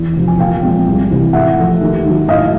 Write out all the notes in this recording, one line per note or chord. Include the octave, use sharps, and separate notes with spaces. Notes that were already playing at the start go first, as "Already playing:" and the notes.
Already playing: E2
C3 F3
G#5
A#2 F5 G5
F3 G#3 C4
C2
C3 E3
A2 E5 F#5
F3 A3
D#2
D#3 F#3
A2 D#5 F5